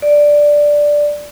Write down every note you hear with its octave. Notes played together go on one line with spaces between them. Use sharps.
D5